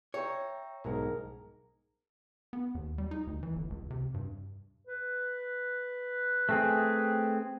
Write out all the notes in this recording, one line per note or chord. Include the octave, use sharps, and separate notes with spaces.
C#5 E5 G5 A#5
B1 G#2 D#4 G#4 A#4
B3
D#2
G3
D#4
D2
E3
G1
C#2
C3
G2
B4
A3 C4 G#4